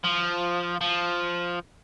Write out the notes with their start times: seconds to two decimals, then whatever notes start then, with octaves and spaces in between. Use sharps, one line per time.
0.04 F3
0.81 F3